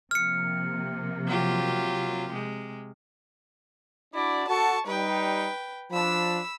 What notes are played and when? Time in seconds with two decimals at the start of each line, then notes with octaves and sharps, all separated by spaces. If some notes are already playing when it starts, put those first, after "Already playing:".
0.11 C3 F3 A#3 F6 C#7
1.27 F#3 F4 G4
2.31 C3 G#3
4.14 D4 E4 F#4 D5
4.48 F#4 A4 A5 C#6
4.87 G3 D#4 B4 G5
5.92 F3 D4 B5 E6